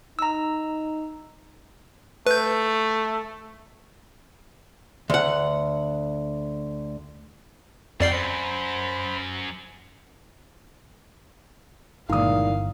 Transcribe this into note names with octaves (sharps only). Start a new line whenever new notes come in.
D#4 A#5 E6
A3 B4 G6
D2 F#5
F2 D3 F4 D5 F#5 G5 C7
F#2 C5 B5
G1 A#2 D#3 E3 G#3 F5 D#6